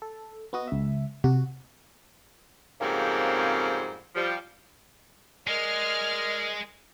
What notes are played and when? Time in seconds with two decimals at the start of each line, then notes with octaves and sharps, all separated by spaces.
0.02 A4
0.53 B3 F#4 D#5
0.68 C#2 E5
1.24 C3 F#4
2.81 F2 G#2 C#3 G3 A#3 C4
4.15 F3 G3
5.48 G#3 A#4 D5 D#5 F6